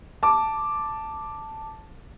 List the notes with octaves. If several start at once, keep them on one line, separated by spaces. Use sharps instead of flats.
A5 D6